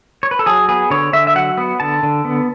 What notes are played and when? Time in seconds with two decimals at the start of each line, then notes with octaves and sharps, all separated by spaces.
0.23 C#5
0.31 B4
0.39 A4
0.46 F#3 G#4
0.69 B3 G#4
0.90 D3 C#5
1.13 D3 E5
1.27 E5
1.35 F#3 F#5
1.58 B3
1.80 D3 A5
2.03 D3
2.25 B3